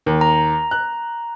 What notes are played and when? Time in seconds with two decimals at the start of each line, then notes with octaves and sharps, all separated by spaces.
0.06 D#2
0.21 A#5
0.71 F#6